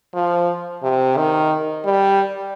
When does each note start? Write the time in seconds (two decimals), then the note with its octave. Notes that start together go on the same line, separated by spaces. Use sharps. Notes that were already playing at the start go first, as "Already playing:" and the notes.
0.14 F3
0.83 C3
1.17 D#3
1.85 G3